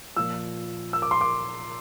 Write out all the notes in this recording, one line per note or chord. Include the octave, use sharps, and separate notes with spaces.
A#2 F3 E6
E6
D6
C6
D6